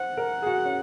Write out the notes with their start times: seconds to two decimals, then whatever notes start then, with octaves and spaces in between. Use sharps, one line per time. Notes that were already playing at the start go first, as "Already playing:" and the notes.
Already playing: C5 F#5
0.17 A#4
0.42 G#4
0.46 F#4
0.65 C#4